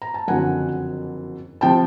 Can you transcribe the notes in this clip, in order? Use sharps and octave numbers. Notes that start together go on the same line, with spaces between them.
A#5
A5
F#1 F2 D3 F#3 F#5 G#5
C3 F3 G5 A5